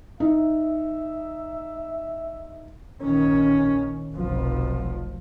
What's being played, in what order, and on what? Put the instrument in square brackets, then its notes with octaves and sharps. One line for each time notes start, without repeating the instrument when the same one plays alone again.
[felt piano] D#4 [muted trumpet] E5
[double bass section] A#1 D#3 C#4
F1 B1 F3